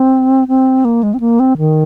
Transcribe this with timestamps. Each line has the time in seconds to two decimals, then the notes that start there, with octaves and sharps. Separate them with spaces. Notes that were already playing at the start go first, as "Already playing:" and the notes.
Already playing: C4
0.48 C4
0.85 A#3
1.03 G#3
1.14 C4
1.20 A#3
1.40 C4
1.58 D#3